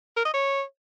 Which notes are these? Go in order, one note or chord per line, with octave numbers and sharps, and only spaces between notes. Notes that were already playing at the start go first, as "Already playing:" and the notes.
A#4
D#5
C#5